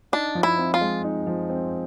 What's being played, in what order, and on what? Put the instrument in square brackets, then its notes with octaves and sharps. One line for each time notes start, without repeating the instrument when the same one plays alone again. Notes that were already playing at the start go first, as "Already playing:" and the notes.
[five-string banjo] D4 [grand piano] D#4
[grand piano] F3
[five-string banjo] E4
[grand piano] C4
[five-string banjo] F4
[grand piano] G#3
D#4
F3
C4